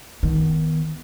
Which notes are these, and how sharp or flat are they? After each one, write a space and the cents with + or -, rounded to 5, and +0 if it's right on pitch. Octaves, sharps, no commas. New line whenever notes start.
D#3 +20 B3 +0